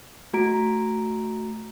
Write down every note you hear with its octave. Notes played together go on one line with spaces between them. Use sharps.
A3 F#4 A#5 D7